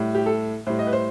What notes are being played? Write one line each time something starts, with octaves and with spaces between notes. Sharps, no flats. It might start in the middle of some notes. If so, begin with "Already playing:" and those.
Already playing: A2 G3
G4
A4
A2 G3 C5
D#5
B4
C5